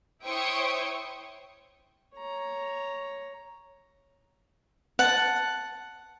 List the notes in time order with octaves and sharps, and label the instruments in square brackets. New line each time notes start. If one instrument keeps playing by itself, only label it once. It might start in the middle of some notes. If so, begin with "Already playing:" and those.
[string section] E4 C5 C#5 G5 C#6 D#6
[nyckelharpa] C#5 A#5
[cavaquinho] F#5 A5